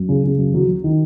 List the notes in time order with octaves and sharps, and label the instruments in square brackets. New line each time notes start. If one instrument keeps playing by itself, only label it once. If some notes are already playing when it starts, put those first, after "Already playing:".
Already playing: [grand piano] F#2
C#3
C#3
F#2
F#3
F#3
D#3